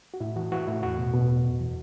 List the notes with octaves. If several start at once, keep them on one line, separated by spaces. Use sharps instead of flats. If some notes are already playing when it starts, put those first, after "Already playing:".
F#4
A2 E4
E3 F#4
E3 F#4
A2 E4
E2 F#4
B2
B2
E2
F#2
E3